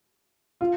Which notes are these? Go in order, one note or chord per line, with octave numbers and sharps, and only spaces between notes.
F4